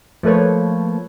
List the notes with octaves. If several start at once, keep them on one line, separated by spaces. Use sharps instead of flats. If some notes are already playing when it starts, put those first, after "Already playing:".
F3 A3 A#3 A4 B4 C#5